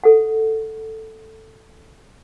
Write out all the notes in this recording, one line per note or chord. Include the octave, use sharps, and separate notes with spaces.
A4 F#5